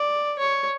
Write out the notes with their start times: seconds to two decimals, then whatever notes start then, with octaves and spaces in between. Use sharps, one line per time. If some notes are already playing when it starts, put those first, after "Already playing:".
Already playing: D5
0.39 C#5